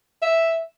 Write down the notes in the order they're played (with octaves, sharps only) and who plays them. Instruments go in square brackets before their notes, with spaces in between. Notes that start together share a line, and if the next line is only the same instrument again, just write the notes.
[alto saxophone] E5